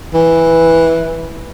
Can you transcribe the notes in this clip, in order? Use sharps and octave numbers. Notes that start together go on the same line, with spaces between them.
E3